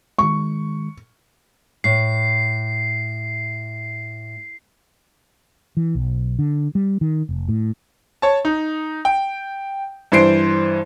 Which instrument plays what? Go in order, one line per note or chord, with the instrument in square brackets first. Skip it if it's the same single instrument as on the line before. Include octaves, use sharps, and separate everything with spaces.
[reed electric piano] D#3 G#3 [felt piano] C#6
[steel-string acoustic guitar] A2 [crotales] C7
[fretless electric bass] E3
B1
D3
G3
D#3
F1
A2
[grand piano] C#5 A5
D#4
G5
G2 E3 C5 C7 D7